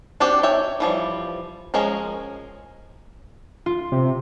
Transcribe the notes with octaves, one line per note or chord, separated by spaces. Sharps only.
C4 D4 F#4 G4
C#5 E5 G5 G#5
E3 F3 G3
F3 G#3 C#4 G#4 A#4
F4
C3